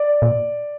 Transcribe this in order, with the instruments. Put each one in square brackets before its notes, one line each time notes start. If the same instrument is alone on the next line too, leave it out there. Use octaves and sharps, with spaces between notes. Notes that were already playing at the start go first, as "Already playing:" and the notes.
Already playing: [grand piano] D5
[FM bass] A#2